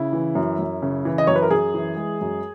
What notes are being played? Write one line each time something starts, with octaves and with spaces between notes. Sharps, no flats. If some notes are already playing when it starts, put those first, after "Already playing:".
Already playing: C#3 E4
E3
F#2
F#2
C#3
E3
D#5
F#2 C#5
B4
A#4
F#2 G#4
E3
G#3
F#2